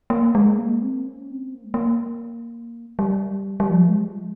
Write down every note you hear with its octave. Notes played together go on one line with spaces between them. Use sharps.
A#3
G#3
A#3
C4
C#4
C4
A#3
G#3
A#3
G3
G3
F3
G#3